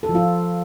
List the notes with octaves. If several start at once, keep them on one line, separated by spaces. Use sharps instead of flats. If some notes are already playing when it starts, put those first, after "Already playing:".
A4
F3
F4